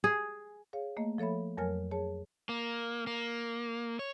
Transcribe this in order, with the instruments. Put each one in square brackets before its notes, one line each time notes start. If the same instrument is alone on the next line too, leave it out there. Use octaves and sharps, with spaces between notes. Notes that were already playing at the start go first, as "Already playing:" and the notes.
[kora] G#4
[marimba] G#4 C#5 F5
A3 A#3 D#5
F3 A4 C#5 E5 B5
F2 F#3 A#4 C#5 G#5 F6
G#4 C#5 A5
[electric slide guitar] A#3
A#3
C#5